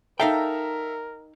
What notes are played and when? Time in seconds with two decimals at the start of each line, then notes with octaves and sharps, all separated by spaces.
0.20 D#4 A4 A#4 E5 F5 G5 A#5